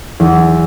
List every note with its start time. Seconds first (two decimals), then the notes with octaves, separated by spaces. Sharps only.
0.20 E2